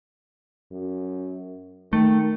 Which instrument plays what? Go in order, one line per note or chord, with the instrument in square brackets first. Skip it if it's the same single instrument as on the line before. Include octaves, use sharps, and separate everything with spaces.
[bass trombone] F#2
[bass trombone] D#3 [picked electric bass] A3